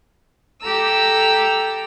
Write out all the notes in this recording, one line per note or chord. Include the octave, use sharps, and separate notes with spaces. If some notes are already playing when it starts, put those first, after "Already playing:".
G4 A4 A#5 E6